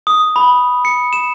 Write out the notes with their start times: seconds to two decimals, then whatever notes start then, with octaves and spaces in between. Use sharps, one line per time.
0.07 D#6
0.36 B5
0.85 C#7
1.13 E7